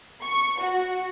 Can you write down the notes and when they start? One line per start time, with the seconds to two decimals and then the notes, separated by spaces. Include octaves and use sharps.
0.22 C#6
0.60 F#4